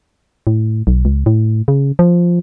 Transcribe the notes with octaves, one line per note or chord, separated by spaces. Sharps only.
A2
B1
C#2
A2
C#3
F3